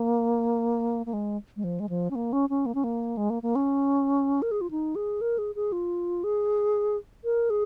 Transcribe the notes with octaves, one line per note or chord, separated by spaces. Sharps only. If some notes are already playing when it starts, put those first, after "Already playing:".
Already playing: A#3
A#3
G#3
G#3
F3
G#3
F3
C#4
A#3
C#4
C#4
A#3
C#4
A#3
G#3
A#3
A#3
C#4
A#4
G#4
F4
D#4
G#4
A#4
G#4
G#4
F4
G#4
A#4
G#4